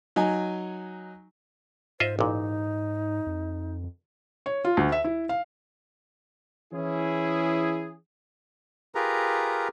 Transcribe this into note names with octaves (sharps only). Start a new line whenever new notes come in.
F#3 D#4 G#5
G#2 F4 C5 D#5 E5
A1 A#2 D#4
F2
C#5
F4
D2
E5
E4
F5
E3 C#4 E4 G#4
F4 G4 G#4 A#4 B4 A#5